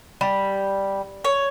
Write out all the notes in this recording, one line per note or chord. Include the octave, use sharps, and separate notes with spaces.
G3
C#5